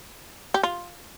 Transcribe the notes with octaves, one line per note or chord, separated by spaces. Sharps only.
G4
F4